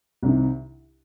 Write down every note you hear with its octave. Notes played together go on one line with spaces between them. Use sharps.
C2 C3 D#3